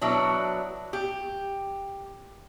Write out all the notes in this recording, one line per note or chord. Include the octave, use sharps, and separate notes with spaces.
B2 F#3 D4 E4
G4